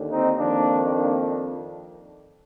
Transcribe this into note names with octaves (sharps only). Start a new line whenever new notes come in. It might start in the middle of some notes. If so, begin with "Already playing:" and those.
Already playing: D#2 D3
C4 D#4
F2 D#3 A#3 D4
A#3 D4